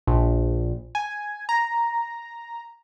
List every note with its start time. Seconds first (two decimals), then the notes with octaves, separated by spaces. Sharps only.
0.07 A#1
0.95 G#5
1.49 A#5